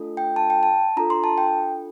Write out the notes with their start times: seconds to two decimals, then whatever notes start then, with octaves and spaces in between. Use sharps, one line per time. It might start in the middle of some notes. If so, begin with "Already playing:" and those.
Already playing: A3 D4 F4 A4
0.17 G5
0.36 A5
0.50 G5
0.63 A5
0.97 D4 F4 A4 A#5
1.10 C6
1.24 A5
1.38 G5